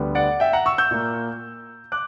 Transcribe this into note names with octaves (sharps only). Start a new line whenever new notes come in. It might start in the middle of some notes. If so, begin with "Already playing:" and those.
Already playing: D2 D3 G3 B3
D5 F#5
E5 G5
F#5 A#5
C#6 E6
E6 G6
A#2 A#3
D6 F#6